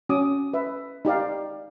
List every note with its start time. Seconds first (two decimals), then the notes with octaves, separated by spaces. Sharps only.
0.09 C#4 F#4 D6 D#6
0.53 B4 E5
1.05 D#4 G4 D5 F5